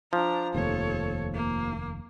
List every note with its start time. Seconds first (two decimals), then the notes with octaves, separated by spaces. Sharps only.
0.13 F3 D4 A#5
0.55 F1 D#2 A4 C#5
1.35 A#3